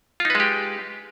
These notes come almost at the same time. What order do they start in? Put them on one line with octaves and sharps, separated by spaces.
F4 D#4 B4 G#3 G4